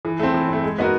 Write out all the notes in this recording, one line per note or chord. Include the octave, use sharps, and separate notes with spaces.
E3
A3 C4
E3
A3 C4
G#3
B3 D#4 F#4 A#4